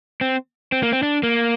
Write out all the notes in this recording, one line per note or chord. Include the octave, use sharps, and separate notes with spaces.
C4
C4
A#3
C4
D4
A#3